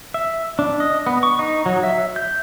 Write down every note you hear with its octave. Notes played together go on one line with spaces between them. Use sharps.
E5
D4
D#5
B3
C#6
D#4
F#3
E5
G6